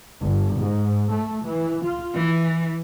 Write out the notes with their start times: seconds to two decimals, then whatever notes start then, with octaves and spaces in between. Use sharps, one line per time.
0.21 G1
0.59 G#2
1.13 A3
1.48 E3
1.84 F4
2.16 E3